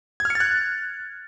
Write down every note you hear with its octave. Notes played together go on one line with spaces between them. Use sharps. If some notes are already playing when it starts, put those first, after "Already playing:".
G#6
F6
C#7
A6
F#6